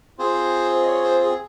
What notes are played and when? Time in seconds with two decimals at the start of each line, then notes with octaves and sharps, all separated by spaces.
0.19 C4 F4 G#4 C5
0.83 D#5
0.87 C#5
1.04 C5
1.22 G#4